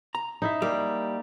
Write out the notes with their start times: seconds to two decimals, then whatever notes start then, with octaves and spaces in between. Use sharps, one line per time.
0.15 A#5
0.42 D#4 E4 E5
0.62 G3 A#3